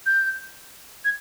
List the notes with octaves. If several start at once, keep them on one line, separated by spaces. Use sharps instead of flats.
G6
G#6